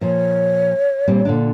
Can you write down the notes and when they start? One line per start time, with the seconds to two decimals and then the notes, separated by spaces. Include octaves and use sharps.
0.01 A#2 F3 C#5
1.08 A#2 G3 C4
1.25 A#2 D3 D4